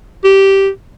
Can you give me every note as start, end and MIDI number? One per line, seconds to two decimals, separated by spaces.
0.24 0.69 67